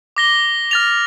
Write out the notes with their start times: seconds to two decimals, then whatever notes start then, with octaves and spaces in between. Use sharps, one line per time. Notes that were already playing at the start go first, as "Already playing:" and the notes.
0.17 D6 A#6 G7
0.71 F6 A6 F7